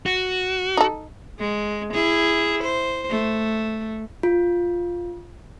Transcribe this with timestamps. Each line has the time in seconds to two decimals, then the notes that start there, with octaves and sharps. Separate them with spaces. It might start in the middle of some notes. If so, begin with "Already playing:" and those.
0.06 F#4
0.77 D#4 A4
1.40 G#3
1.93 E4 G#4
2.64 C5
3.10 A3
4.23 F4